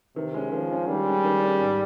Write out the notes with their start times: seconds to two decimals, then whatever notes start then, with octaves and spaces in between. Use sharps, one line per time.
0.16 C3 D#3
0.34 G#3 C#4
0.52 D#3 F3
0.70 G#3 C#4
0.88 D#3 G3
1.06 G#3 C#4
1.24 D#3
1.42 G#3 C#4
1.60 G#2